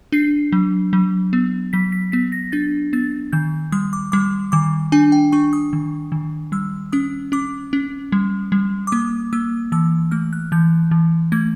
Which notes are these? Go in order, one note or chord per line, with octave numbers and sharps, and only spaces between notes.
D4 C7
F#3
F#3
B3
F#3 B6
B6
B3 B6
A#6
D4 A6
B3 A6
D#3 G6
G3 D#6
D6
G3 D6
D#3 D6
D4 G#5
G5
D4 C#6
D#6
D#3
D#3
G3 E6
C#4 D#6
C#4 D6
C#4
G3
G3
D6
A#3 D#6
A#3 E6
E3 E6
A3 F6
F#6
E3 G6
E3
A3 G#6